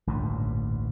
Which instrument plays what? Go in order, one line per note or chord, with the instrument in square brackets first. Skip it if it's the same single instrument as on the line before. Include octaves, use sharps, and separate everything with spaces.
[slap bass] A1 D2 G2 A#2